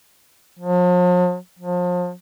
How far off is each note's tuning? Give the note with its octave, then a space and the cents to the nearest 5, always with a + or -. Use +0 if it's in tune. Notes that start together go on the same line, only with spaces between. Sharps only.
F3 +45
F3 +35